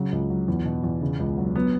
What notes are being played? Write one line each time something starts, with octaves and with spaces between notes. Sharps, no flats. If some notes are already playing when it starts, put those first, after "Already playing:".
Already playing: C#3 F#3
C#2
F#3
E2
B2
E2
C#3
C#2
F#3
F#3 B3